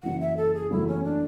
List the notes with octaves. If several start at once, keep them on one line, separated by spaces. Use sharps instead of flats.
F#1 F#2 E3 F#5
E5
A4
G#4
F#1 E2 C#3 F#3 A3 E4
C#4
D4